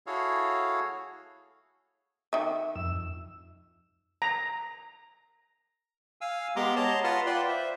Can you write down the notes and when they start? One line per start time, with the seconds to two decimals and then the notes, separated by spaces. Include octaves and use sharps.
0.07 E4 F#4 G#4 A4 C#5 F5
2.33 D#3 E5
2.76 F2 E6
4.22 A#5
6.21 F5 G#5 E6
6.56 G#3 B3 G4 A#5 C6 D6
6.76 C#5 D#5 A5 A#5 C6
7.04 F4 B4 F#5 A5 C6 F6
7.26 F4 B4 D5 G5 C6
7.48 C5 E5